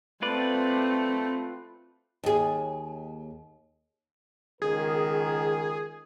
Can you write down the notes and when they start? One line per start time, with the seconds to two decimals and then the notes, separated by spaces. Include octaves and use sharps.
0.22 A3 C4 F4 B4 D5
2.24 D#2 G#4
4.62 C#2 D#3 G#4 A#4